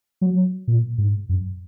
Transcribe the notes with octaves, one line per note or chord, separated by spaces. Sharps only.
F#3
A#2
G#2
F#2